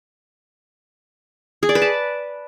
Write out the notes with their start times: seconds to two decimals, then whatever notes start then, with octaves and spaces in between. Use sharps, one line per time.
1.63 G#4
1.69 D5
1.75 B4
1.82 A5